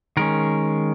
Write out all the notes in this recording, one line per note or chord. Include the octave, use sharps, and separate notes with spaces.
D#3 G#3 C#4 A#4